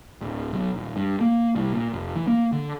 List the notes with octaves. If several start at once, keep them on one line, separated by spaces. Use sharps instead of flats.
D1
B1
D#1
G2
A#3
C2
A#2
F1
E3
A#3
D3